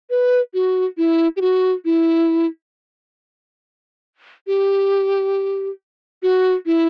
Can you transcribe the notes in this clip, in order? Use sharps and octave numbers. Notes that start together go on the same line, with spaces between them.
B4
F#4
E4
G4
F#4
E4
G4
F#4
E4